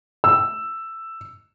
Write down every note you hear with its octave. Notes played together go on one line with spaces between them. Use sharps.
E6